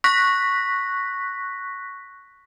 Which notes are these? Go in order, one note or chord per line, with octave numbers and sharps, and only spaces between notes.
C#6 F#6 A#6 B6